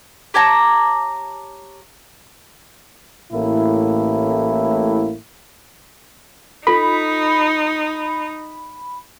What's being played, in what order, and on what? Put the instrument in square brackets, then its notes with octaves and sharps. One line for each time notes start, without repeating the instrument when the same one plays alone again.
[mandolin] G4 C#5 A5 A#5
[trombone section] A1 A2 A#3 E4
[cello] D#4 [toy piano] F4 A4 [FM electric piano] B5